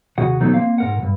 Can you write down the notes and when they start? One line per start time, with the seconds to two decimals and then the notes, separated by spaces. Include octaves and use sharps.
0.18 D#2 C3 F#4 G#4 F#5
0.40 B2 D#3 E3 F#3 A3 C4
0.54 A#3 C4 F5
0.78 G#2 A#4 F#5
0.99 C#2 G2